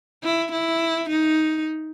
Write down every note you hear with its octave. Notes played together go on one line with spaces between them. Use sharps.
E4
E4
D#4